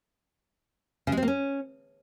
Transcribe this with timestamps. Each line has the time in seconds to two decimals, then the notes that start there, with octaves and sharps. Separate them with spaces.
1.07 C#3
1.12 G#3
1.17 C4
1.23 A#3
1.28 C#4